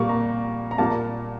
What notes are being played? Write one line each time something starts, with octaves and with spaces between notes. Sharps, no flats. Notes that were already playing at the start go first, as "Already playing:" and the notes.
Already playing: A#2 G3 A#3 C#6
A#5
A#5
A#2 G3 A#3 A5